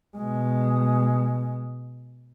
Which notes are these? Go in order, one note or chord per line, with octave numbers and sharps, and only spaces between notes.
B2 G#3